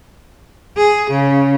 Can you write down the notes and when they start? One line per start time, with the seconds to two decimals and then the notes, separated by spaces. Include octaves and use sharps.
0.77 G#4
1.10 C#3